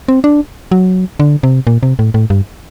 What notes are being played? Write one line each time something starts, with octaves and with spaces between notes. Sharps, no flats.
C4
D4
F#3
D3
C3
A#2
C3
A2
A2
G2